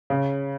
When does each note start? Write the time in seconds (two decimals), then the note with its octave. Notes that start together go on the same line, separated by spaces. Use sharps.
0.10 C#3